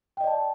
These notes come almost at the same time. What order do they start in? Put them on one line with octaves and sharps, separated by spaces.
G5 D#5 D5 A5